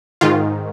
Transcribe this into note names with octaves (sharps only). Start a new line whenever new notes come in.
G#2 D#3 F4